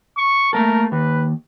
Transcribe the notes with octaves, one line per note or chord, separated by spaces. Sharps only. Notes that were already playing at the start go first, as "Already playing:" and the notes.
C#6
A3 A#3 A4 A#4
D#2 B4